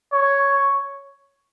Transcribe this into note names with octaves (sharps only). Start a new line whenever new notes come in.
C#5